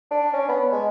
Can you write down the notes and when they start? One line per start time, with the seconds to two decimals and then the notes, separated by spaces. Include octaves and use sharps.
0.11 D4
0.33 C#4
0.49 B3
0.72 G#3